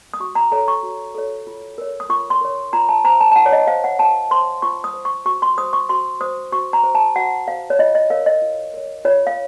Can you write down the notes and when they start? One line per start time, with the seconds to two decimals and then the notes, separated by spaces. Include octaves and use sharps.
0.14 D#6
0.20 F#4 C#6
0.35 A#5
0.51 A4 C#5 A#5
0.68 C#6
0.83 F#4
1.15 A4 C#5
1.47 F4
1.78 A#4 C#5
2.00 D#6
2.09 F4 C#6
2.30 C6
2.41 A#4 C#5
2.73 F4 A#5
2.89 A5
3.04 C5 A#5
3.21 A5
3.32 A5
3.36 F4 F#5
3.46 C#5
3.53 D#5
3.67 C5 F5
3.84 F#5
3.99 F4 A5
4.31 C5 C6
4.62 F4 C#6
4.84 D#6
4.94 C5
5.05 C#6
5.25 F#4 C#6
5.42 C6
5.58 C5 D#6
5.73 C#6
5.89 F#4 C6
6.21 C5 D#6
6.52 F#4 C#6
6.73 A#5
6.83 C5
6.95 A5
7.16 F#4 F#5
7.47 C5 F5
7.70 C#5
7.79 F4 D#5
7.95 D#5
8.10 A#4 C#5 F5
8.26 D#5
8.42 F4
8.74 A#4 C#5
9.05 F4 C#5
9.27 F5